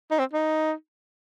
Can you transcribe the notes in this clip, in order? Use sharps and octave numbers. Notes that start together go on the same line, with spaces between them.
D#4
C4
D#4